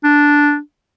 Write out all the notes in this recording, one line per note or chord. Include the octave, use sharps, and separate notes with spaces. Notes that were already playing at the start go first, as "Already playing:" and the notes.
D4